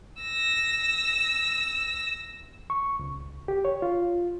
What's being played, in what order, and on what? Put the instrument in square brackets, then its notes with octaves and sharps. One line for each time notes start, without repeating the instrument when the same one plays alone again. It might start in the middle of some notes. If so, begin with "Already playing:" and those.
[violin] E6 A#6
[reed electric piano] C#6
C#2
G4
C#5
F4